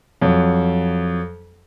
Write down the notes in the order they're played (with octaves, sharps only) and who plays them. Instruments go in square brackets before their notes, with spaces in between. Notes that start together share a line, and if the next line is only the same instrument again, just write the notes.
[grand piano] F2 F#3